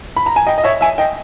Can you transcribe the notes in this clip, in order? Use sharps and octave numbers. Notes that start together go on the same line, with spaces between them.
B5
A#5
G#5
D#5 G5
D#5
C#5 E5
E5 G#5
D#5 G5